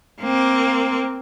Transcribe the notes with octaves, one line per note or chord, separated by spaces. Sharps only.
A#3 C4